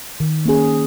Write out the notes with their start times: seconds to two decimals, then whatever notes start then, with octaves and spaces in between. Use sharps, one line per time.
0.20 D#3
0.45 A#3 C#4 G#4